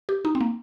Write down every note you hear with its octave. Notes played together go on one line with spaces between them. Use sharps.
G4
D#4
C4
A#3